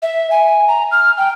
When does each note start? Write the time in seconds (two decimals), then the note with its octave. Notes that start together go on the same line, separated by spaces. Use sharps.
0.02 E5
0.31 G#5
0.68 A#5
0.92 F6
1.17 G5